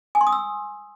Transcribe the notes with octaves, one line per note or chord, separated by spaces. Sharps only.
G#5
C6
D#6
E6